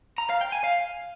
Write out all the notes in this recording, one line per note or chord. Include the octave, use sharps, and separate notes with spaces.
A#5
F5
G5
G#5
F5